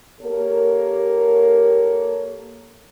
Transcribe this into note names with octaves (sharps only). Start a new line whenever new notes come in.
A#3 G4 A4 A#4 C#5